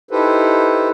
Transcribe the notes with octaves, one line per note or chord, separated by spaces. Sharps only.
D#4 E4 G4 A4 B4 C5